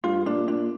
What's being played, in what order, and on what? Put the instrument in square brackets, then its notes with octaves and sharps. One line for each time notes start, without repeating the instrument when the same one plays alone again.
[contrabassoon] G2 [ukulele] F4
[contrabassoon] A#2 [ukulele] D4
[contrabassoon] A#2 [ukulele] D4